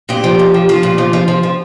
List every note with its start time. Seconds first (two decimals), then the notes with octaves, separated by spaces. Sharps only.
0.09 A#2 G4
0.24 F3
0.39 A#2
0.54 F3
0.69 F3 F4
0.83 A#2
0.98 F3
1.13 F3
1.28 F3
1.43 F3